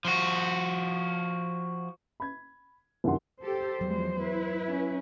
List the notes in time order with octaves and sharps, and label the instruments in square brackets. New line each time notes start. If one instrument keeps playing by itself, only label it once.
[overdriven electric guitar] F3 F#4
[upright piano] B5 G#6
C2 F#2 D#3 F#5 C6
[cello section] G4 A4 [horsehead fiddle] C5
[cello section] E2 F3 G#3 [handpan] F#3
[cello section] E4 B4
[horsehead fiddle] C#4